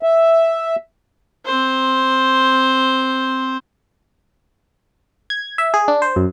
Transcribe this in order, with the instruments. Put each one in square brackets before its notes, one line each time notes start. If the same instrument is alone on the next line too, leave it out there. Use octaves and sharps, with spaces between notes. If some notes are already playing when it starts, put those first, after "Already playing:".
[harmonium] E5
[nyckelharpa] C4 C5
[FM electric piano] G#6
E5
G#4
D4
C5
F#2